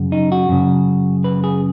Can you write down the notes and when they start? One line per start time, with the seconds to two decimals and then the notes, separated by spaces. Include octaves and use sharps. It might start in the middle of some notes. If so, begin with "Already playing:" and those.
Already playing: F#2 C#3
0.12 D#4
0.32 F#4
0.49 F#2 C#3
1.24 B4
1.44 G#4